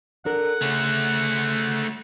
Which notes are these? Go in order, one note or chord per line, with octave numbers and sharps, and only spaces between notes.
D4 A4 A#4 F#5
C#3 A3 F#4